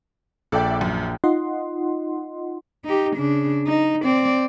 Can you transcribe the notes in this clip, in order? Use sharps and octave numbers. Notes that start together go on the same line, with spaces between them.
A#1 A4 D5 E5 G5
F#2
D#4 F4 D#5 F#5 C6
D#4 G4
C#3 D4
D#4
C4 D5